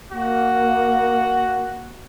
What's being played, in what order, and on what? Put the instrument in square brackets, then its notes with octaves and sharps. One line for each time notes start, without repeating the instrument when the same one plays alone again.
[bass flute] A#3 [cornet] F#4